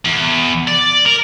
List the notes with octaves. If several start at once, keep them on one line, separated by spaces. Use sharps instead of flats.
E2
D5
A#4